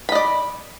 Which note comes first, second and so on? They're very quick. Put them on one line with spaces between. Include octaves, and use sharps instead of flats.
B5 D#5 D5